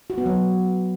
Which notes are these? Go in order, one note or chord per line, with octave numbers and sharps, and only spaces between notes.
F#4
B3
F#3